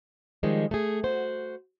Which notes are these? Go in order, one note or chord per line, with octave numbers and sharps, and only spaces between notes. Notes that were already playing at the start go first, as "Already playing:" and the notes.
D#3 F3 G3 G#3 C#4
A3 G#4
F#4 C5